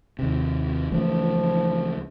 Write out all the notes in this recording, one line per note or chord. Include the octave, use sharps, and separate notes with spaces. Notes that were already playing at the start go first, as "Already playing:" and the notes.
D#2 C3
C#2 E3 F3 A3